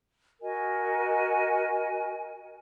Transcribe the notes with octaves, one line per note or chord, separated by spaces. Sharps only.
F#4 A#4 D#5 G#5